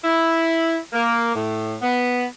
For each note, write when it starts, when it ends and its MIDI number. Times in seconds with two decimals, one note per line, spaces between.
0.04 0.77 64
0.93 1.34 58
1.35 1.76 45
1.82 2.24 59